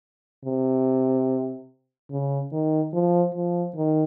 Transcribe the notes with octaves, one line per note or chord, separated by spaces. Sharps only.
C3
C#3
D#3
F3
F3
D#3